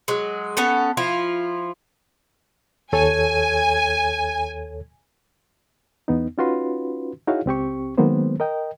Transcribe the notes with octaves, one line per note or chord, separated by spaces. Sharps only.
F#3 G#3
B3 C#4 A4
F3 E4 F4
D#2 A4 C#5 G#5
E2 B3 D#4
C#4 D#4 F4 F#4 B4 C6
D#4 E4 F#4 G#4 C#5 F5
C#2 C4 G4 C#6
D#3 F#3 G#3 A#3 B3 C5
A#4 D#5 G5